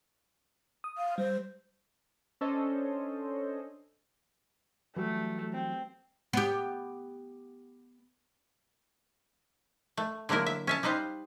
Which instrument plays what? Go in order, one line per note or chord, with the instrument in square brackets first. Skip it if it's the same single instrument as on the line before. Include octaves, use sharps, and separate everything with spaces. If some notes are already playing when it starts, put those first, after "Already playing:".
[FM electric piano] D#6
[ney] F5
[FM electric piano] G3 [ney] C5
[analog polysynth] C#4 D4 A4 C5 C#5 D#5
[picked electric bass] E3 F#3 G3 [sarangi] A3
[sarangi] C4
[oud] B3 G4
[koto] A3
D3 F#3 A#3 E4 A#4
E5
C#4 E5 A5
G3 D#4 B4 C5 F5